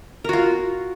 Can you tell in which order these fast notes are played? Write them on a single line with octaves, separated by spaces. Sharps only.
A#4 F#4 F4